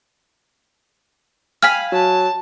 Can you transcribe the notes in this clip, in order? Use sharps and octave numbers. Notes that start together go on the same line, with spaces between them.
F5 G#5 B5 F6 B6
F#3 A5